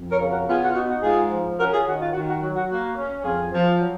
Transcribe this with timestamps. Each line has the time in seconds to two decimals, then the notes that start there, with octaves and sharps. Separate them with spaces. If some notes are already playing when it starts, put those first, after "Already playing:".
Already playing: F2
0.11 A#4 C#5
0.20 C#3
0.29 F#4 A#4
0.48 B3 F4 G#4
0.62 F#4
0.69 F4
0.75 D#4 F#4
0.89 F#4
1.03 G#2 F4 G#4
1.30 F3
1.58 C#4 F#4 A#4
1.72 F4 G#4
1.86 D#3 F#4
2.00 F4
2.13 D#3 F#4
2.28 F#4
2.41 F#3 F#4
2.55 F#4
2.69 A#3 F#4
2.96 C#4
3.24 F2 F4 G#4
3.52 F3
3.79 F#3